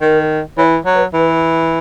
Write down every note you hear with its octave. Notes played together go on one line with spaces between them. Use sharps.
D#3 A#4
E3 C#5
F#3
B4
E3 B4